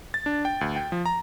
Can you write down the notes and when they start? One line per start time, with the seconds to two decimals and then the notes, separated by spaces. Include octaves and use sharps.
0.14 A6
0.26 D4
0.45 G5
0.61 D2
0.76 G5
0.92 F3
1.06 A#5